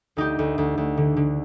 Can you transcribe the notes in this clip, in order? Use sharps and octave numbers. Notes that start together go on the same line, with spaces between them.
D2 D#4 G4
D2
D2
D2
D3
D3